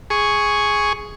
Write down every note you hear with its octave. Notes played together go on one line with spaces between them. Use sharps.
G#4 C#6